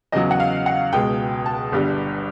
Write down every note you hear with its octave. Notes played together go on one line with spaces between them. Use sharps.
E2 C#3 F#3 D#5
F#5
F5
F#5
C#2 B2 G#3 G5
A5
G1 G2 D3 G3